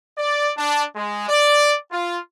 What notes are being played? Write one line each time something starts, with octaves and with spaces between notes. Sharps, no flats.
D5
D4
G#3
D5
F4